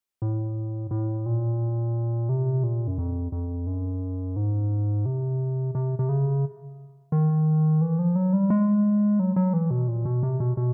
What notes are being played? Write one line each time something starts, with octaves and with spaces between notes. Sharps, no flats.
A2
A2
A#2
C3
A#2
F#2
F2
F2
F#2
G#2
C3
C3
C3
C#3
D#3
E3
F3
F#3
G3
G#3
F#3
F#3
E3
B2
A#2
B2
C3
B2
B2